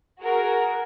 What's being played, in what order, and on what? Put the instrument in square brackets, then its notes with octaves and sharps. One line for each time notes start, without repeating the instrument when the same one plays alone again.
[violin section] F#4 G#4 A#4